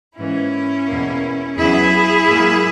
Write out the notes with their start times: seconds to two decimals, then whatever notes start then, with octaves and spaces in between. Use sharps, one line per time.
0.16 G#2 E3 A#3 C#4 E4
0.86 E2 B2 A#3
1.55 E2 C#3 F#3 E4 G#4
2.26 G#2 F#3 A#3